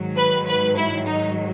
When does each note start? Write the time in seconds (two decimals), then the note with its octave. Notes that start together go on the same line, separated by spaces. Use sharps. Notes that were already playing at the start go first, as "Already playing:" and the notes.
Already playing: G#2 D#3 F#3
0.17 B4
0.47 B4
0.77 E4
1.06 D#4